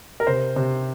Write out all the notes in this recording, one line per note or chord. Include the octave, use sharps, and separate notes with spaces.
A#4
C3 C5
C3